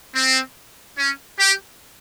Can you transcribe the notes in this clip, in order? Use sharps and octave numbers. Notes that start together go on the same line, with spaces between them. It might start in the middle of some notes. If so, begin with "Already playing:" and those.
C4
C#4
G4